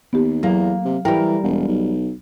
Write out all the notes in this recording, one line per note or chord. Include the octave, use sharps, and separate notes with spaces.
D#2 B3 G4
E2 F#3 A#3
C3
E3 G3 A#4 G5
E1
B1